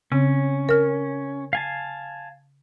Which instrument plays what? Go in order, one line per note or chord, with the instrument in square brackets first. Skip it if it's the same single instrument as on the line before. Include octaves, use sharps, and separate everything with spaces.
[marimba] C#3 C4 [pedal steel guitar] C#4
[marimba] A#4 F6
[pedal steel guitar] F5 G#5 A5